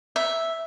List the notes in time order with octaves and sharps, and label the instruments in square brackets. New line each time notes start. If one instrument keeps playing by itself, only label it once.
[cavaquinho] E5